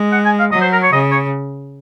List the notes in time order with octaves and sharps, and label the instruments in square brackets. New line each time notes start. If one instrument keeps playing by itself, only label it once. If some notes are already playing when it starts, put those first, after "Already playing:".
Already playing: [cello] G#3
[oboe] F#5
G#5
F5
[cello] F#3 [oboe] D#5
[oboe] C5
A#4
C#5
[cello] C#3 [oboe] D#5
[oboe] C#5